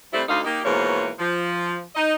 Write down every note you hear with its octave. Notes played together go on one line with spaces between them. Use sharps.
C3 G3 A3 C4 E4
D2 D#4 F5
A#3 D#4 G4
G#2 B2 E3 F3 A#3 C#5
F3
D#4 D#5